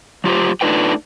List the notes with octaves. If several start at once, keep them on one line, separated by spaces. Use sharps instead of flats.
F#3 F4 G4 C5
A3 D4 D#4 F4 B4 G5